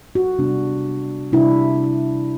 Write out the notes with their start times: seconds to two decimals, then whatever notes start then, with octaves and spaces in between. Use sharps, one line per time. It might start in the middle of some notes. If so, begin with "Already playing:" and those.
0.15 F#4
0.39 C3 G3 B3 D4
1.32 C3 G3 D4 E4